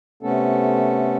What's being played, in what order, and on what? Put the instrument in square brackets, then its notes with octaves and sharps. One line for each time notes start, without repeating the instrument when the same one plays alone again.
[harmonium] C3 A3 B3 C#4 A4